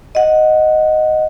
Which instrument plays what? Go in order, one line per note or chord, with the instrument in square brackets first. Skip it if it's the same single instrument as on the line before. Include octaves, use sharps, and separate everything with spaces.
[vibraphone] D#5 F#5